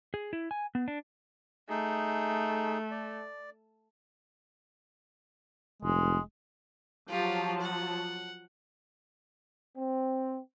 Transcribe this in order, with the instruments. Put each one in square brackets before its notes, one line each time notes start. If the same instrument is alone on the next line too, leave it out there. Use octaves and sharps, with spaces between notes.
[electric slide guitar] G#4
E4
G#5
B3
D4
[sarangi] A3 [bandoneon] D#4 G#4
[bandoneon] D5
[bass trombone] F1 [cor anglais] G#3
[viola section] F3 F#3 A5 [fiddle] F4 G4
[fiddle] F#5
[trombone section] C4